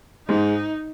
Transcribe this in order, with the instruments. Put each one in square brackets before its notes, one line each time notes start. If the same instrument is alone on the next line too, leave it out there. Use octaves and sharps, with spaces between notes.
[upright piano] G#2 G#3 [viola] D#4